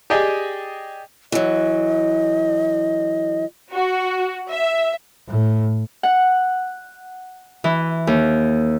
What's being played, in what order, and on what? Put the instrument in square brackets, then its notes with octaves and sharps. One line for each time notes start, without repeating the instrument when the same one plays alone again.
[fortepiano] G4 G#4 D5 D#5 G5 G#5
[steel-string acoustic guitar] E3 F#3 [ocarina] D#5
[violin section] F#4
E5
[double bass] A2
[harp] F#5
E3
D#2